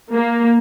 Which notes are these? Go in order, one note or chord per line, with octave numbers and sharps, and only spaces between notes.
A#3